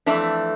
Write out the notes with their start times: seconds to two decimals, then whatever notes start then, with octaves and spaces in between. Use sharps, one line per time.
0.06 F2 E3 A3 D4